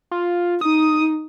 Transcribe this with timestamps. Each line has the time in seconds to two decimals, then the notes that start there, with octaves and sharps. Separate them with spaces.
0.11 F4
0.61 D#4 D#6